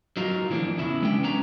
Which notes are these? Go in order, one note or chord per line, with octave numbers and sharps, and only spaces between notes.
F#3 D#4 F4 A#4
E3 F3 A#3 D4
E2 C#3 E4
G#3 B3 C#4 D4 G5
B3 C#4 D4 B4 A#5